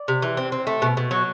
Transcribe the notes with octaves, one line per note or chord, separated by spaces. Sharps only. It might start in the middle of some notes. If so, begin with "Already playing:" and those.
Already playing: D5
C3
E3
C4
C4
A3
B2
B2
F#3